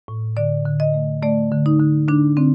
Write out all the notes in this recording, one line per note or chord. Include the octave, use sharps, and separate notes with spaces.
A2
D3 D5
D3
D#5
A3
A3 D5
D3
D#4
D3
D3 D4
D3 C4